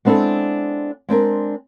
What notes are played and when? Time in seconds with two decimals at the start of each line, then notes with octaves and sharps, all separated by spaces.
0.05 G#3 B3 C4 D4 E4 A4
1.09 G#3 C4 D4 A#4